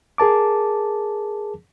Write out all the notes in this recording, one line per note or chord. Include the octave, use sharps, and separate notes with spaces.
G#4 A#4 A5 D6